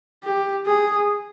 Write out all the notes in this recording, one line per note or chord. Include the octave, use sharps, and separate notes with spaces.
G4
G#4